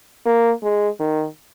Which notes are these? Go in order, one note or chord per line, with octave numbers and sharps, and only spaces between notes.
A#3
G#3
D#3